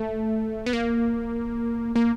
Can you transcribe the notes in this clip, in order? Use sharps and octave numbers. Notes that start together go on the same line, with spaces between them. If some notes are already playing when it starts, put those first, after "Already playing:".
Already playing: A3
B3
A#3
A#3